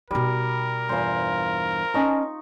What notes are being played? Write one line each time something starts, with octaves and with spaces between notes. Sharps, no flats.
B2 G3 D#4 A#4
E2 G2 F4 C5
C#4 D#4 D#5 A5 C#6